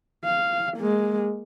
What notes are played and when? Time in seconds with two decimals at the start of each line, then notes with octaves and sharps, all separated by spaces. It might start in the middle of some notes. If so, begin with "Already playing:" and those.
0.25 F5
0.77 G#3 A#3